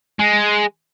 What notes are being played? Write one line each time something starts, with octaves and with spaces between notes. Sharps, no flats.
G#3